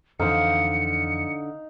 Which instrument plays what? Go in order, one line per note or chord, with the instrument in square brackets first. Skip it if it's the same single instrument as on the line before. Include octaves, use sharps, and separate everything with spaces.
[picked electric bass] F2 E3 [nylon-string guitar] D3 C5 [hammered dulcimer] D#4 F5 [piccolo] C#7